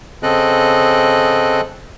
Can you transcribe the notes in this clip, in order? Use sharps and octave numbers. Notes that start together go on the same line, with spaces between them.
C#3 C4 A4 D#5 F#6